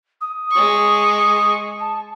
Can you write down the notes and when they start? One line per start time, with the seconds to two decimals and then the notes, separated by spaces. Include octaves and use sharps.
0.21 D#6
0.52 G#3 C#6
1.80 A5